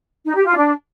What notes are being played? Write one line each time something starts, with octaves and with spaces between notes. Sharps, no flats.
D#4
G4
F4
D4